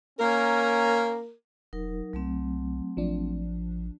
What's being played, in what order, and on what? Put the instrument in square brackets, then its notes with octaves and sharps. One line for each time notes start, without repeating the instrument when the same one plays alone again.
[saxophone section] A#3 A#4 [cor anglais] C#4
[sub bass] E1 [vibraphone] F#3 D#4 A#4
[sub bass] C2 [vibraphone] F#3 A3 C4
[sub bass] A1 [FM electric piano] F3 D4